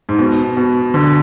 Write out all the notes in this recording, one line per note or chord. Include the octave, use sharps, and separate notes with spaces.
G#2
B2
B2
B2 D3